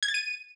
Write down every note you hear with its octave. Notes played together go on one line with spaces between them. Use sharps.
G#6
A6
D#7